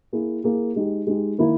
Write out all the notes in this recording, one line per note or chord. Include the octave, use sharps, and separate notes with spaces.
A#3 E4 G#4
A#3 E4 G#4
G#3 D#4 G4
G#3 D#4 G4
D#3 A#3 E4 A#4